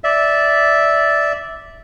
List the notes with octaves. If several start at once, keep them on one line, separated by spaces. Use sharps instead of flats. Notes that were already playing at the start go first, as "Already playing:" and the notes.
D5 E5